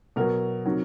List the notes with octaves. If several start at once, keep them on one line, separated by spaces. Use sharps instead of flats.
B2 F#3 A#4
C3 D#3 F#3